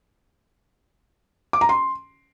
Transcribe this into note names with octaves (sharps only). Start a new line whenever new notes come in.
D6
A#5
C6